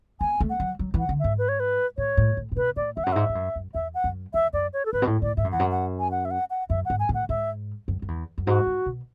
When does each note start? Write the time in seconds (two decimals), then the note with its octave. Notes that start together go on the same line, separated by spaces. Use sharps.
0.20 B3 G#5
0.40 A3
0.50 F#5
0.60 F#3
0.79 F#3
0.94 E3
0.99 F#5
1.09 D3
1.19 G#2 E5
1.38 B4
1.49 C#5
1.60 B4
1.97 A2 C#5
2.17 A2
2.37 A2
2.52 A2
2.57 B2 B4
2.76 A2 D5
2.96 E2 E5
3.04 F#2 F#5
3.12 G#2 E5
3.29 G#2
3.35 F#2
3.56 F#2
3.74 E2 E5
3.94 F#5
4.04 F#2
4.34 E2 E5
4.53 F#2 D5
4.73 C#5
4.86 A4
4.93 G#2 B4
5.02 B2
5.07 A2
5.22 A2 D5
5.37 G#2 E5
5.44 F#2
5.52 E2 F#5
5.59 F#2
5.71 F#5
6.00 G#5
6.11 F#5
6.25 E5
6.31 F#5
6.50 F#5
6.70 F#2 E5
6.85 G#2 F#5
7.00 G#5
7.09 A2
7.14 F#5
7.29 G#2 E5
7.88 F#2
8.02 F#2
8.08 E2
8.38 F#2
8.47 G#2 F#4
8.66 G#2
8.86 B2